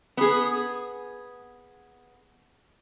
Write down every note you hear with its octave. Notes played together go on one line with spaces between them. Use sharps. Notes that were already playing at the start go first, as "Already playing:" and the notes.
B3 G#4